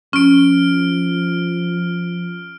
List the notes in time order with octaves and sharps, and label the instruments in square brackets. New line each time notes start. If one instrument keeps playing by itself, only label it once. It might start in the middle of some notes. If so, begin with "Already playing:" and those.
[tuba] F3 [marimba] C#4 [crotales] F6 D7